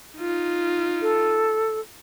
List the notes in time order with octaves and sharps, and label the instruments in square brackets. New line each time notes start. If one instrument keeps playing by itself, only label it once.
[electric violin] D#4 F4
[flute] A4